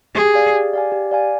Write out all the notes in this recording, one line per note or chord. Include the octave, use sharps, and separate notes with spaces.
G4 G#4
D5 F5 G#5
G4
D5 F5 G#5
G4
D5 F5 G#5